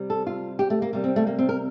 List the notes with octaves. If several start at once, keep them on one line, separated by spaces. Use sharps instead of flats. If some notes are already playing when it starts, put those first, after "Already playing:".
Already playing: C3 G3
A4
F4
G4
A3
A#3
C3 G3 A#3
C4
A3
A#3
C4
A#4